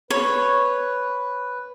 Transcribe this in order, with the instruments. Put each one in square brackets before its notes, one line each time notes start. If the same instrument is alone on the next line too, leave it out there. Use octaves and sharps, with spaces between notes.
[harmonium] B4 [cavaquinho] C#5